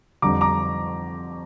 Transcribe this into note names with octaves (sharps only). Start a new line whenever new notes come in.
F2 D3 G3 A#5 D6
A#5 D6